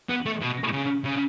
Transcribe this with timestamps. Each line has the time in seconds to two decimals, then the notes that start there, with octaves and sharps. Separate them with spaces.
0.09 B3
0.26 A3
0.41 B2
0.73 C#3
1.05 C#3